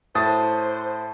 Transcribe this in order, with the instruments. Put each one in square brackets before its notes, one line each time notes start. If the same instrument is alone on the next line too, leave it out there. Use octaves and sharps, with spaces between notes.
[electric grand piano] A2 [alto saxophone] C5 [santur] A5 [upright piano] D#6 A6